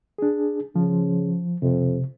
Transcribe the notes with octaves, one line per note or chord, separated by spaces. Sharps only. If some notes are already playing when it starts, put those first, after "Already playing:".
D4 G#4
C#3 F3
F2 C3